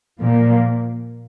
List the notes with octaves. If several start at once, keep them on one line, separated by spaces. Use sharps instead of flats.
A#2 F3 A#3